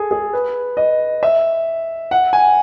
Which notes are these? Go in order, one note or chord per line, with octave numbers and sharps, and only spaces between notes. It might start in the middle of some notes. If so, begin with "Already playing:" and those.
Already playing: G#4 A4
G#4
B4
D#5
E5
F#5
G#5